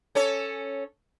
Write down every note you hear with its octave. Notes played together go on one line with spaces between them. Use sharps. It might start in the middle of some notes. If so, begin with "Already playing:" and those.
C#4 A4 C#5